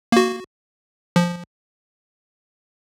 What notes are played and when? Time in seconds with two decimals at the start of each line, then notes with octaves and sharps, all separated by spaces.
0.12 A#3 F#4
1.16 F3